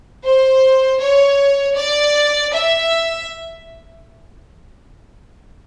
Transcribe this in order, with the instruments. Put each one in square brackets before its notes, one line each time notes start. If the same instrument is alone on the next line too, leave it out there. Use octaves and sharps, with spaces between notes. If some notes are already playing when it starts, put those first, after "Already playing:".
[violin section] C5
C#5
D5
E5